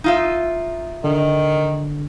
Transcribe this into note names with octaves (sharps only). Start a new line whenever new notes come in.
D#4 F4 E5
D3 D#3